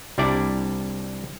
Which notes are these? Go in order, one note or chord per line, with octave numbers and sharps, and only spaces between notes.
C2 G3 D4 E4 D5